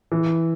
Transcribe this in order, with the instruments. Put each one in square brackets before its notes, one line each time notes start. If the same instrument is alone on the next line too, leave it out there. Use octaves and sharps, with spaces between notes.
[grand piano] E3